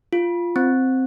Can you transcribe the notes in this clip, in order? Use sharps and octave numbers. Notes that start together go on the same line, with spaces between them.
F4
C4